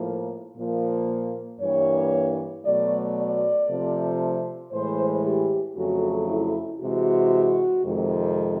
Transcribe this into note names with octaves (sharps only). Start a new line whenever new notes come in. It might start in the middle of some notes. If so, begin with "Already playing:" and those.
Already playing: A2 F3 A#3
A#2 F3 A#3
G2 E3 G3 A#3 C#5
B2 F#3 A3 D5
D5
C3 F3 A3
A2 E3 G#3 C5
G4
F2 C#3 F#3 A3 F#4
E4
C3 E3 G#3 F#4
F2 C3 D#3 G#3